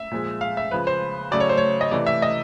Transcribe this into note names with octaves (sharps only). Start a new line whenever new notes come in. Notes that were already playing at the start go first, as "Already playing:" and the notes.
Already playing: E5
A#2 F3 G#3
F5
E5
C#3 F3 G#3 B4
C5
C#3 F#3 A3 D5
C#5
C5
C#5
D#5
C3 E3 A3 D5
E5
D#5